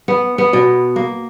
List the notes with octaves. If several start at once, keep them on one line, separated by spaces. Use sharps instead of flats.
B3
B3
B2
A#3